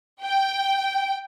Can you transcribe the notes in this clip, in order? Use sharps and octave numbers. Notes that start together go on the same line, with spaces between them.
G5